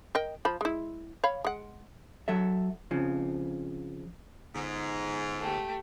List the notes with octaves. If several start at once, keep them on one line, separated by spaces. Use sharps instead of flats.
A#4 D#5 G5
F3 B5
G#3 E4
C#5 F5 B5
G#3 F#5
F#3 A4 E5
F2 C#3 F3
G1 G#2
A3 G4